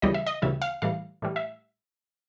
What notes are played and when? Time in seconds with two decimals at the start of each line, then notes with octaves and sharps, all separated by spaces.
0.02 D2 C#3 E3 G3 D#5
0.14 E5
0.26 D#5
0.42 D2 C#3 E3 G3 E5
0.62 F5
0.82 A2 E3 G3 F5
1.22 A2 E3 G3
1.36 E5